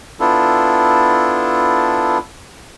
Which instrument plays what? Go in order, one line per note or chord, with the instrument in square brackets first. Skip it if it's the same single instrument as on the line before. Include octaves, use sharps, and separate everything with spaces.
[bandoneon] B3 D4 E4 F4 A4